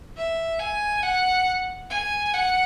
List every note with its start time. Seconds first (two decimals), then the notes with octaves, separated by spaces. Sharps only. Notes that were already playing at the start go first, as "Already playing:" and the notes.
0.17 E5
0.60 G#5
1.03 F#5
1.90 G#5
2.34 F#5